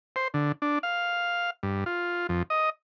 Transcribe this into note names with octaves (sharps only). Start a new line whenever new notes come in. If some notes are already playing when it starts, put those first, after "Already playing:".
C5
D3
D4
F5
G2
F4
F2
D#5